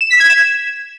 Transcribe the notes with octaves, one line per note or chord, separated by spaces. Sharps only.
E7
B6
G#6
E7